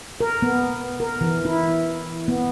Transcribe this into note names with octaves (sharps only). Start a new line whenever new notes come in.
A#4
B3
A#4
E3
E4
B3